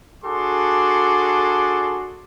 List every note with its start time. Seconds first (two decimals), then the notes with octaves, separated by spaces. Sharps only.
0.25 D4 F#4 G#4 A4 C6 D6